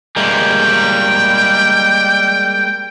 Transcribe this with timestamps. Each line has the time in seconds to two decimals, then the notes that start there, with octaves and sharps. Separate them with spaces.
0.16 G3 G#3 A#3 G5